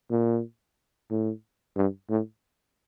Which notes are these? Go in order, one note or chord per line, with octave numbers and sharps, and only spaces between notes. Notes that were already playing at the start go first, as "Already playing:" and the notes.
A#2
A2
G2
A2